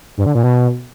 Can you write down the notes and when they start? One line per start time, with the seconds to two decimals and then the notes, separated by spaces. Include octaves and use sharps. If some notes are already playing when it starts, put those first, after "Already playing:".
0.17 G2
0.26 D3
0.35 A#2
0.44 B2